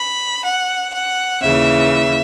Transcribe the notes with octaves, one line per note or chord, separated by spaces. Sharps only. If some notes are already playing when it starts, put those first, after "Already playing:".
Already playing: B5
F#5
F#5
D#2 C#3 E3 E5